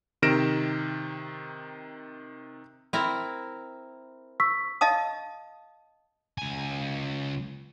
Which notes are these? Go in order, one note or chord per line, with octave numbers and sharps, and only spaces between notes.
C3 D#3 F6 A#6 D7 E7
C4 E4 A#4
C#6 E6 B6
D#5 F5 A5 D#6
C#2 G#5